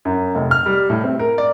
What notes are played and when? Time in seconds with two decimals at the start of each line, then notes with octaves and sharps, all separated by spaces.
0.05 F#2
0.35 F1
0.51 F6
0.66 G3
0.90 A2
1.04 C4
1.19 A#4
1.38 D5